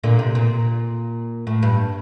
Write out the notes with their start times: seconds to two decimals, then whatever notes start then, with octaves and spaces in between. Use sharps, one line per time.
0.04 A#2 D3
0.19 C3
0.35 A#2
1.47 A2
1.63 G2